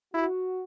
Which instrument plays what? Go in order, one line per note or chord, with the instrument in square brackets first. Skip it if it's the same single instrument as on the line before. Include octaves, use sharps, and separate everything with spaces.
[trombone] E4 [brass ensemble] F#4